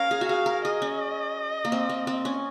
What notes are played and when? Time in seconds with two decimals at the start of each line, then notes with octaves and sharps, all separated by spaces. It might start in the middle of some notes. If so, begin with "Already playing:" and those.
Already playing: C#4 A#4 F5
0.11 G#4
0.21 F#4
0.29 G#4 F5
0.46 A#4
0.65 G#4 D#5
0.82 C#4
1.65 A#3
1.72 C4
1.89 C4
2.07 C4
2.25 C#4